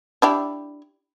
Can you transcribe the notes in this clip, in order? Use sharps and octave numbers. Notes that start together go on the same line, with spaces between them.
D4 E4 G4